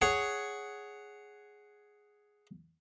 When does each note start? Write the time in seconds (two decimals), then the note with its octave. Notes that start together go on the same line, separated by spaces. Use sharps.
0.02 G#4 C#5 F#5